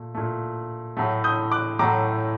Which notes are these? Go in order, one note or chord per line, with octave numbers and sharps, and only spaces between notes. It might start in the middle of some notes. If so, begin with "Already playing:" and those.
Already playing: A#2 A3
A#2 A3
A2 F#3 A3
D#6 G6
D6 F#6
A2 F#3 A3 A#5 D6